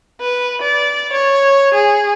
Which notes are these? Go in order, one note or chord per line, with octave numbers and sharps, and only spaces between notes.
B4
D5
C#5
G#4